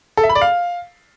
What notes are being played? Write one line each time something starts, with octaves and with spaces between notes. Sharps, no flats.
A4
E5
B5
D5
F5